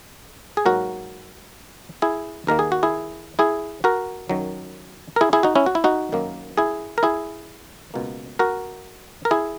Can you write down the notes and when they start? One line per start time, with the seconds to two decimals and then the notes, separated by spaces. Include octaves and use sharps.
0.57 G#4
0.65 G#2 F#3 A#3 F#4 A#4
2.02 E4 G#4
2.47 D#2 D#3 A#3 A#4
2.59 G#4
2.72 F#4
2.83 E4 G#4
3.39 E4 G#4
3.84 F#4 A#4
4.29 F#2 D#3 F#3
5.16 A#4
5.21 E4 G#4
5.33 E4 G#4
5.43 D#4 F#4
5.55 C#4 E4
5.66 F#4
5.75 E4
5.84 D#4 F#4
6.12 F#2 D#3 A#3
6.57 E4 G#4
6.98 A#4
7.03 E4 G#4
7.94 C#2 B2 A#3
8.39 F#4 A#4
9.25 A#4
9.31 E4 G#4